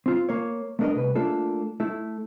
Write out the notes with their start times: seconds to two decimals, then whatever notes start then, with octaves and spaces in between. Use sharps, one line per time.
0.06 C4 F4
0.29 A#3 C#5
0.79 A3 B3 D4 A#4 D#5
0.95 C2 B4
1.15 A3 A#3 D4 F4 A4
1.80 A3 E4